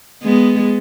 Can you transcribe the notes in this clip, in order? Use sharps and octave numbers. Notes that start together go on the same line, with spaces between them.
G#3 B3